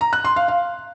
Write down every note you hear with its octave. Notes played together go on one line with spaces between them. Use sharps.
A#5
F#6
C6
F5
F5